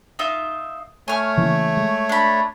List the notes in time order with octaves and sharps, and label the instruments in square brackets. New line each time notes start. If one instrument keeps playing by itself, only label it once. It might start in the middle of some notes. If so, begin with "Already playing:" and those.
[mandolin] D#4 F4 E5
[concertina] A3 C#5 [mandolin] G#5 F6
[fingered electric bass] C#3 E3 A#3
G#3
[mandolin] D4 B5